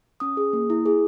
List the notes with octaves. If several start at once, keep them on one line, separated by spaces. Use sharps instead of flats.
C#4 D#6
G#4
A#3
E4
G#4